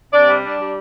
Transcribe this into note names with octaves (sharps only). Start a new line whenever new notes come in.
C3 D4 D5
G3
D4
G3